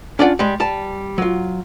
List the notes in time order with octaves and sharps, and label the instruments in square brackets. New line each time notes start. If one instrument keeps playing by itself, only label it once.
[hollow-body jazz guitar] C#4 D4 F4 D5 F#5
G3 G#3
G3 A5
F#3 F4